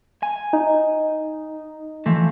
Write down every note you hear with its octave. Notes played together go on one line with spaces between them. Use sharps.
G#5
D#4
E3 F3 A3